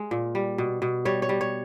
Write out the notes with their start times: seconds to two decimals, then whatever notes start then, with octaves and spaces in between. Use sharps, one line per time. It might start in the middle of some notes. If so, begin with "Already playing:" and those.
Already playing: G#3
0.11 A#2
0.35 G3
0.58 B2
0.82 B2
1.05 G3 C#5
1.22 C#5
1.29 G3
1.41 C#5